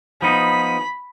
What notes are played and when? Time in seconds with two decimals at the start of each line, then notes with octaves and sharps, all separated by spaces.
0.22 F3 B3 D#4 B5